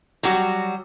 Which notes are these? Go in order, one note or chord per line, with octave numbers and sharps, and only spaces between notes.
F#3 G3 F#4